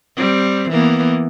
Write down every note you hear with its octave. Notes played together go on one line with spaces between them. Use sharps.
G3 C4
E3 A#3 B3